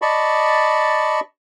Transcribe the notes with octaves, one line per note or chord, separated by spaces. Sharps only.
D5 D#5 A5 B5 C#6